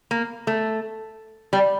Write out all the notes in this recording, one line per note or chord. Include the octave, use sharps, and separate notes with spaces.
A#3
A3
G3